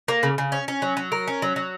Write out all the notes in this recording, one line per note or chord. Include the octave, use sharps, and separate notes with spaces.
A#3
C#3
C#3
C#4
C#4
F#3
F#3
A#4
C#4
F#3
F#3